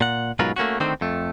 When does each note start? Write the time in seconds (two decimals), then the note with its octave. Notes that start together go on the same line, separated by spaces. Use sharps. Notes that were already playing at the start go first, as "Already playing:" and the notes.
0.01 A#2 F#5
0.39 G#2 B2 F#3 F4 A#4 B4
0.56 A3 A#3 C#4 F#4
0.80 D3 D#3 A3 C4 C5
1.01 F2 A3